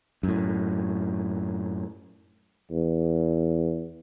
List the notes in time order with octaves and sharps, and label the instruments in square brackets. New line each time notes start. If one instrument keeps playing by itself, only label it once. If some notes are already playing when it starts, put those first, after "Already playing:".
[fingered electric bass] F#2 A2
[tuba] E2